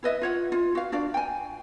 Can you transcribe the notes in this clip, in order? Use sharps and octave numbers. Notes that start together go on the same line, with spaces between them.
E4 B4 D#5 E5
F4 C#5 F#5
F4
F#4 F5
D4 F#4 D5 F5
G5 G#5